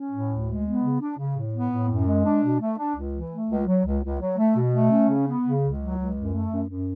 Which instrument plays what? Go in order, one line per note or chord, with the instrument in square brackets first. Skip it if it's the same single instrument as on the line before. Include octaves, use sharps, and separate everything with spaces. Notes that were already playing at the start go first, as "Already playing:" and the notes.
Already playing: [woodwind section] C#4
A2
D2
G#3
B3
C#3
D4
C#3
A2
B3
A2
F#2
G#3
D4
B2
A3
D4
C#2
E3
A3
C#2
F#3
C#2
C#2
F#3
A3
B2
A3
C#4
C#3
B3
C#3
C#2
F#3
C#2
F#2
A3
F#2
F#2